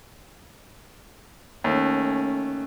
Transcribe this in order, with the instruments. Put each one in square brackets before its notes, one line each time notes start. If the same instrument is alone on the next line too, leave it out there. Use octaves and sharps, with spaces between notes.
[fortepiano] D#2 [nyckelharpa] A3 C#4